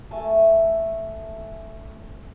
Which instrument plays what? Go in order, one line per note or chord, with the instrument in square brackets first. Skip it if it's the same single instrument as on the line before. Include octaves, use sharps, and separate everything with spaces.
[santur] A3 G#5 A5